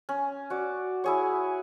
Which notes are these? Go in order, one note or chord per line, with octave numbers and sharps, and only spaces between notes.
C#4
F#4 D5
E4 G#4 C#5